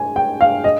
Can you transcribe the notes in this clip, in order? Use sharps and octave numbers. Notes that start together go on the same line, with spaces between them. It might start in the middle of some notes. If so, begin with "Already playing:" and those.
Already playing: G#5
G5
F5
D#5